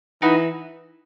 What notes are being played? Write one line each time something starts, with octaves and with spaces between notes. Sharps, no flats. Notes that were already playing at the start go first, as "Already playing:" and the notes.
E3 D#4 F#4 B4